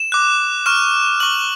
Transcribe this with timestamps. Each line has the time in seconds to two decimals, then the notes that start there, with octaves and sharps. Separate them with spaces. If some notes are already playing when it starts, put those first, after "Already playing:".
Already playing: E7
0.12 D6 F#6
0.66 C#6 F6 E7
1.20 C#6 F6 F#7